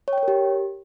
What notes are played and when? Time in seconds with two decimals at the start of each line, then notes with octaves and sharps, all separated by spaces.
0.08 C#5
0.13 G5
0.18 C#5
0.23 A#4
0.28 G4